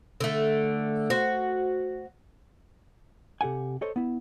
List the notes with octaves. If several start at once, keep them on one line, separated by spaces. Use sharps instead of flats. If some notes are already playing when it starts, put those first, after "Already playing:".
D3 A3
F#4 C5
C3 G4 A4 F#5 G#5
A4 C5 C#5 D#5
B3 E4